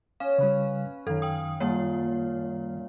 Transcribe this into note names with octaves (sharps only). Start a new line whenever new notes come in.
C#4 F5
C#3 G3 B4 C#5
F#2 D#3 A4 F5 A#5
G5 D#6
A#2 G3 A#3 C#5